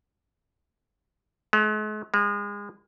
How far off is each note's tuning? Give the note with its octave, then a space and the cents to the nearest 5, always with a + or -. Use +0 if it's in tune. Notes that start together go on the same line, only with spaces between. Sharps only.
G#3 +45
G#3 -30